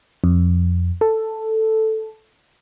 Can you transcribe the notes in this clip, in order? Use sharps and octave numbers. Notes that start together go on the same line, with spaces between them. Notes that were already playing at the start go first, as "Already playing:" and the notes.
F2
A4